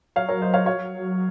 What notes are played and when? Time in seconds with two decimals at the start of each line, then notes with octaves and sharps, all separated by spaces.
0.16 F#3 C#5 F5
0.29 A#4 C#5
0.42 C5 D#5
0.54 C#5 F5
0.66 C#5 F5